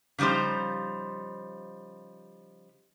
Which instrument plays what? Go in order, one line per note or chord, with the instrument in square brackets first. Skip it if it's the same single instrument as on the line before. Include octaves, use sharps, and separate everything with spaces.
[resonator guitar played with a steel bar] C#3 F3 G3 D#4 C5